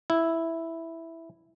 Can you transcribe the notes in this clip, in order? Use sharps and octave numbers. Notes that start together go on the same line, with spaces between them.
E4